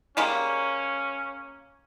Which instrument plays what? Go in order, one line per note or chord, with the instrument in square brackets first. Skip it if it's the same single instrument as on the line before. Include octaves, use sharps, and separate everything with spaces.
[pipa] G3 G#3 A#3 [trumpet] C#4